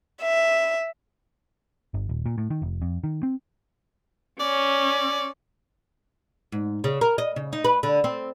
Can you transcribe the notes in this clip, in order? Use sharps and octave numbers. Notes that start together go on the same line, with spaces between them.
E5
G1
D#1
A#2
A2
D#3
F1
F2
D#3
C4
C#4 D5
G#2
C#3
A#4
D#5
C#3
D#4
B4
D3
C4